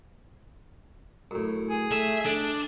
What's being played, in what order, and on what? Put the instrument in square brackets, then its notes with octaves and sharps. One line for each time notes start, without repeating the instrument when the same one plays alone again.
[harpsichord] F#2 A2
[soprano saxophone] G#4
[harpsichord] A3 [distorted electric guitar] E5
[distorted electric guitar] D4 [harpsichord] A4